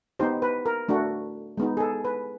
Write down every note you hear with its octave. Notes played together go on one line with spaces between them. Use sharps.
B3 D#4 G4 C5
B4
A#4
A3 D4 F#4
G#3 B3 D#4
G#4
A4
B4